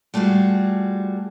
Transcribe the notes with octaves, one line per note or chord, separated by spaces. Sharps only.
G3 A3 F4 F#4 G#4